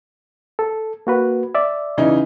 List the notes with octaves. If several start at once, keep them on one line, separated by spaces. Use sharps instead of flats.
A4
A#3 F#4 B4
D5 E5
C#3 E3 D#4